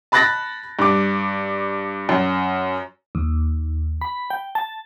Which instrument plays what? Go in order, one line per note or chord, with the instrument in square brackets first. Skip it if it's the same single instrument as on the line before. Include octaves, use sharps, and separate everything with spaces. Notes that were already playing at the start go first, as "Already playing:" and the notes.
[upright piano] A5 B5 F#6 A6 A#6
G2 D6
F#2
[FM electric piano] D#2
B5
G5
A5